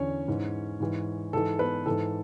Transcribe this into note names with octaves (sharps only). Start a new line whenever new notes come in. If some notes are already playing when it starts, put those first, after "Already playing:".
Already playing: E2 D3 C#4 C#5
G#2 E3
G#2 E3
G#2 E3 A4
B3 B4
G#2 E3 A4